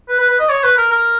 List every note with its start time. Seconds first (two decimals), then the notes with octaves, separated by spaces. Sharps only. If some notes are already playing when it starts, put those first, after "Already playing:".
0.08 B4
0.19 B4
0.29 B4
0.39 D#5
0.49 C#5
0.64 B4
0.77 A#4
0.91 A#4